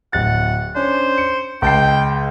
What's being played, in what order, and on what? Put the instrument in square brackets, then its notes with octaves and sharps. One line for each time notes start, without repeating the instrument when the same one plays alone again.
[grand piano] D1 A6 [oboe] F#5
[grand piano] C#4 D4 [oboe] C5
[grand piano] C#7
[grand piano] C#2 A5 C7 [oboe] G5